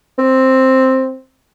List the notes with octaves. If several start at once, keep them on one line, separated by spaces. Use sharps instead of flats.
C4